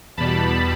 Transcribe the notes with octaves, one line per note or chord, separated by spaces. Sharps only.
E2 B2 G3 A5 B5